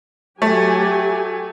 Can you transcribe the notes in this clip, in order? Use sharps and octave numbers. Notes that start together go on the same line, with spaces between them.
F#3 A3 G4 G#5